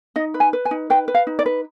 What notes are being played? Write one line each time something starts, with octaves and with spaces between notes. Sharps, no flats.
D#4 D#5
B4
G#5
B4
G#5
D#4
B4 G5
B4
F5
D#4
D5
B4